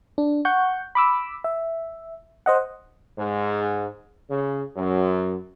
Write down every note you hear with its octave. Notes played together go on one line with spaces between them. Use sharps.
D4
F#5 C#6 G6
B5 D6 E6
E5
C5 D#5 F#5
G#2
C#3
F#2